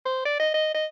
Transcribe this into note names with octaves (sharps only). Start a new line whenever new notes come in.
C5
D5
D#5
D#5
D#5